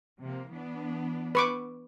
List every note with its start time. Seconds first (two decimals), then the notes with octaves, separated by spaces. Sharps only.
0.21 C3 F3 A#3
0.52 E3 B3 D4
1.35 B4 C#6 D6